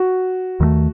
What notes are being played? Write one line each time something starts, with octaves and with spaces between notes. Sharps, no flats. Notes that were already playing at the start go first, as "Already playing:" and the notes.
Already playing: F#4
D#2 D#3 F#3 A3